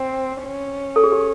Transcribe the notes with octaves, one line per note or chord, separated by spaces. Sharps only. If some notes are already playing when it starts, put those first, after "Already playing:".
Already playing: C4
C#4
A4
G#4
G4